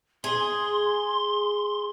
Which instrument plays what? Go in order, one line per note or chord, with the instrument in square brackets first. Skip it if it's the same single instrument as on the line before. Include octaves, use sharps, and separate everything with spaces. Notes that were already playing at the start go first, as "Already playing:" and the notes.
[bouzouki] G#4 [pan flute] C6